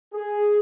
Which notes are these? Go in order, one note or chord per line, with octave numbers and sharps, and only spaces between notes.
G#4